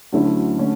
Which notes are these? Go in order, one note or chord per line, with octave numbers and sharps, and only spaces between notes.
D2 D3 F#3 C#4 E4
D3 A3 C#4